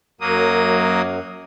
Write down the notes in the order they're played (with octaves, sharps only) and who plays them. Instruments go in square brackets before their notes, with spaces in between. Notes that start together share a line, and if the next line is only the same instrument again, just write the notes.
[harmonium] F#2 [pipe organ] F#3 A#3 D#6